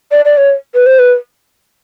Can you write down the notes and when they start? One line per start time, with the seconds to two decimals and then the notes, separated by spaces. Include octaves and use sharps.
0.11 D5
0.25 D5
0.37 C#5
0.74 B4
0.86 C5
0.99 B4